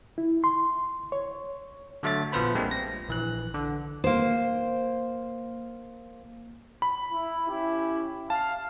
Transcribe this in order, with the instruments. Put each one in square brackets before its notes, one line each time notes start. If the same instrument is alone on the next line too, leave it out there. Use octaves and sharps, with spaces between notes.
[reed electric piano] E4
C6
C#5
[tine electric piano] D3 F#3 A3 E5 A6
A#1 F3 B3 B4 C5 B5
G3 G#3 A#3 C4 D4
A#6
A#1 E3 F#6
D3
[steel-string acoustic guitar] A#3 C5
[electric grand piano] B5
[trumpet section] E4
C#4 E4 G4
[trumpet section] F5 [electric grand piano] A5